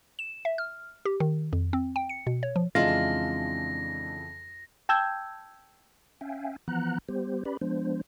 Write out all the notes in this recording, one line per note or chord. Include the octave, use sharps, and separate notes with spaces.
E7
E5
F6
G4
D#3
F2
C4
G5
C#7
B2
C#5
F3
F2 C#3 E3 G#3 D4 F4 A#6
G5 A5 E6 G6 G#6
C#4 E5 F5 G5 G#5
E3 F3 B3 F#5 A#5 F#6
G3 B3 G4 C5
C#4 G4 B4 D5 B5
F3 G#3 B3 D4 C5